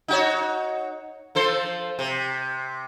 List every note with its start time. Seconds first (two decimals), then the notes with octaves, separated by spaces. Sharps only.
0.08 D#4 F#4 C#5
1.35 F3 A4 C5
1.99 C3